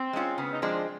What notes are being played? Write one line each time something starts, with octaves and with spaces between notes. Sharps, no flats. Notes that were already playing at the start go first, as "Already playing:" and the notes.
Already playing: C4
G#3 C#4 F4
C#3 B3
D#4
F3 G#3 C4 D4